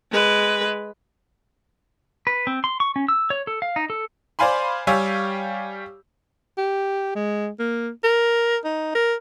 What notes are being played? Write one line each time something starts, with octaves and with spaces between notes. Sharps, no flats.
G#3 B4
B4
C4
C6
C#6
C#4
E6
C#5
A4
F5
D#4
A4
C5 D5 F5 G#5 B5 C6
G3 G4 C#5 F5 G#5 E6
G4
G#3
A#3
A#4
D#4
A#4